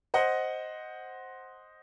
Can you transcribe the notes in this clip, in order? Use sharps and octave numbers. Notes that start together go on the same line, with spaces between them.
C5 D#5 F#5